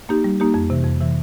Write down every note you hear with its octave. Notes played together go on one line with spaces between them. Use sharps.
A#3 D#4 G4
G3
A#3 D#4 G4
F2
C3 E3
F2
C3 E3